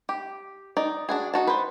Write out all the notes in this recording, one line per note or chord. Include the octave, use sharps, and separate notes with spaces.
G4
D#4 D5
D4 F#4 G#4
D#4 F#4 A5
B4 C5